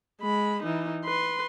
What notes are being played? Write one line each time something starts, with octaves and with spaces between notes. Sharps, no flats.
G#3 B5
E3 D#4
B4 C6